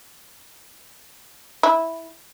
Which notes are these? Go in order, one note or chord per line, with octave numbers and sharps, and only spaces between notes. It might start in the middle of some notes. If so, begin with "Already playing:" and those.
E4